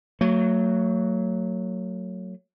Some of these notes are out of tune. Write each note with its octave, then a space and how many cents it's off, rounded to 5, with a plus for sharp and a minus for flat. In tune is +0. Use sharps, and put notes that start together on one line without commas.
F#3 +0 A3 +45